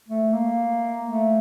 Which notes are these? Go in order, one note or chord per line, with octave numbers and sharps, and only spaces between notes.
A3
A#3
A3